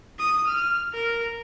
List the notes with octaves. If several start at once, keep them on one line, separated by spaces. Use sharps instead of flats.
D#6
F6
A#4